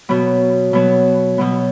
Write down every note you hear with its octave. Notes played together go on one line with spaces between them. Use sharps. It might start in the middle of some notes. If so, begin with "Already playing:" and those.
B2 F#3 B3
B2 F#3 B3
B2 F#3 B3